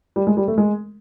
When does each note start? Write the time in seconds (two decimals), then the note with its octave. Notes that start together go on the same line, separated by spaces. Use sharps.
0.16 G3
0.27 G#3
0.37 G3
0.48 A3
0.58 G#3